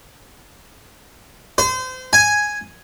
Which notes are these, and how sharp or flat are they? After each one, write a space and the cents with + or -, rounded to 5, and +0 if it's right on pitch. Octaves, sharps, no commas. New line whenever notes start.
C5 -30
G#5 +5